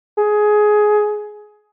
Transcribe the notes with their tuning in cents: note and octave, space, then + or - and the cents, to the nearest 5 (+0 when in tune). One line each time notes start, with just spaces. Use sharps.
G#4 +15